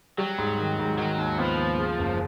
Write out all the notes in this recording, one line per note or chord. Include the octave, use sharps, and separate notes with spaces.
F#3 G3
G#2
D#3
G#2
D#3 F#3
D#2
F3 B3
D#2
C#3
F#1